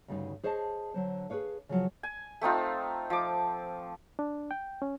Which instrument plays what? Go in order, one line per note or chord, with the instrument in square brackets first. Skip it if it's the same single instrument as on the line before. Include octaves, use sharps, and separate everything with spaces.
[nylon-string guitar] D2 G2 C#3 D#4
G#4 C5 C#5 D#5 G#5 A5
D3 F#3 C5
G#4 A#4 B4 C#5 F5
C#3 F3 F#3 F4
[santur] G#5
A3 C4 D#4 F4
F3 D6
[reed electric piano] D4
G5
C#4